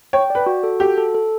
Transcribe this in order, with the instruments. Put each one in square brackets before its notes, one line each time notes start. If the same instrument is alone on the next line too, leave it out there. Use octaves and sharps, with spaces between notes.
[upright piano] C#5 [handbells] G5
[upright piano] B4 [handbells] D5
[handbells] F#4
A4
[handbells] F#4 [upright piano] G4
[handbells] A4
A4